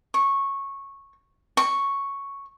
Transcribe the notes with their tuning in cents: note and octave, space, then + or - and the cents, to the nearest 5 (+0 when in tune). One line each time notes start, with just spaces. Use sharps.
C#6 -10
C#6 +0